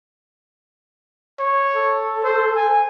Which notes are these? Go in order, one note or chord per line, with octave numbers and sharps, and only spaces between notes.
C#5
A4
C5
G#5